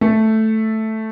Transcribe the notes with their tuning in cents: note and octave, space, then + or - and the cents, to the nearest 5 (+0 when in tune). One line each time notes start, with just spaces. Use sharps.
A3 +0 A4 +0